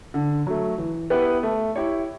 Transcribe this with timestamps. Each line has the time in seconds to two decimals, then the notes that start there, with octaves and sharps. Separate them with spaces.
0.14 D3
0.47 F#3 A3
0.78 E3
1.10 B3 E4 G4 B4
1.43 A3
1.76 E4 G4 C#5